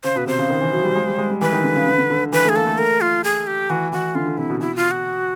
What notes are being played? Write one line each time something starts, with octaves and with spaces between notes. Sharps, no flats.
C#3 C5
B2 B4
C3 C5
C#3
D#3
E3
F#3
G3
G#3
G3
G#3
G3
E3 B4
D#3
D3
C#3
D3
D3
D3
E3 B4
A3 G#4
A#3 A4
A3
A#4
F4
G#4
G4
E3 F#4
E3 F#4
D3 F4
D3
C3 E4
B2
B2 E4
F4
F#4